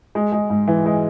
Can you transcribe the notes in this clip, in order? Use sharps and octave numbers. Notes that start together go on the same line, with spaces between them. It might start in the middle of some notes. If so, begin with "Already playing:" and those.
G#3
G#3
G#2
E3
G#3